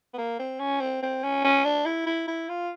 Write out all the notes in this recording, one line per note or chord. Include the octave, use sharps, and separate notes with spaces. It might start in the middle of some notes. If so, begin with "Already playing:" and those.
B3
A#3
C4
C#4
C4
C4
C#4
C#4
D4
E4
E4
E4
F4